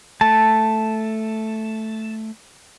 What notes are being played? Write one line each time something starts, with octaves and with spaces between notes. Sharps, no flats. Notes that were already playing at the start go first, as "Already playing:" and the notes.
A3 A5